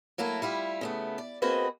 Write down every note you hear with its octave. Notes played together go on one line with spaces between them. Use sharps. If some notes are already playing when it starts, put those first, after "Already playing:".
F#3 A3 A#3 E4
G3 E4 F4
C#3 A3 B3
D5
A#3 C4 F#4 G#4 B4 D#5